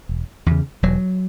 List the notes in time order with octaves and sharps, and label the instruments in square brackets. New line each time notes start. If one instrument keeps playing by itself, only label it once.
[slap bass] E1
E2 C#3
E1 F#3